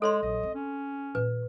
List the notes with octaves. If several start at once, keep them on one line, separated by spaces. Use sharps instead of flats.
G#3 A4 C#5 C6
A#1 F#3 D#5
C4
C#4
A#2 D#3 B4